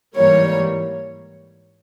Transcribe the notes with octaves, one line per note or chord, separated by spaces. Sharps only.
G#2 E3 G3 A#3 C#5